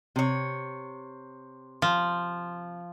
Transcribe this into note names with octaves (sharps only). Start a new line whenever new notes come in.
C3 C#5
F3